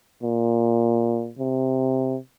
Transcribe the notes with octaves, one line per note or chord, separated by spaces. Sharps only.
A#2
C3